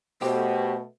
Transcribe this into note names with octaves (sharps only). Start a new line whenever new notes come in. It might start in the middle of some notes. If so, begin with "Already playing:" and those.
B2 A3 G4 C5